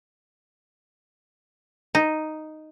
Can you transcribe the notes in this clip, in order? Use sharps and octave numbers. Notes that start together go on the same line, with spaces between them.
D#4